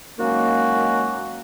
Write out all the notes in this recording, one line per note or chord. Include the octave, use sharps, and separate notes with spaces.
D#3 F#3 G#3 A#3 C#4 F#4